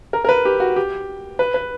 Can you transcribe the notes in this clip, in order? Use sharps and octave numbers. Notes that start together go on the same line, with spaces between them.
A#4
A#4
B4
G4
F#4
G4
B4
B4